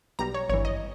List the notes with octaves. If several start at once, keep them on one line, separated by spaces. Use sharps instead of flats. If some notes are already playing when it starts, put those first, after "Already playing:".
B1 B2 G3 A#5
C#5
G#1 G2 E3 C#5
D#5